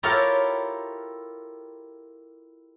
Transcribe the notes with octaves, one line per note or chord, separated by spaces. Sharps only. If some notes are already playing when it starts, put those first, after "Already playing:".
E4 F4 G4 A4 A#4 C#5